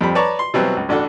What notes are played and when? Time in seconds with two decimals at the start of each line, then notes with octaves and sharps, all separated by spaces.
0.01 F2 G3 C4 B5
0.15 B4 C#5 D5 A5 A#5 C#6
0.39 C6
0.54 B2 E3 F#3 G3 C4
0.77 C#2
0.89 A1 D4 F#4 A4